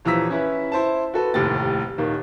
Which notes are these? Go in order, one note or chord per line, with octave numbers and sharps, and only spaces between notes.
D#1 E3 F3 A#5 E6 B6
C#4 E4 B4
E4 C5 A5
F#4 A4 B4
F1 D#2 A2 C3 A6
D#1 D#3 A#3